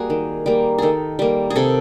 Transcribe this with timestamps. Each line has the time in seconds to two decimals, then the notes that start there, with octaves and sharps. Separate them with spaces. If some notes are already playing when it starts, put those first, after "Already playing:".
Already playing: G3 A#3 F#4 G#4
0.10 D#3
0.46 G3 A#3
0.78 D#3 G#4 A4
1.19 G3 A#3
1.50 G#4
1.56 C3 A4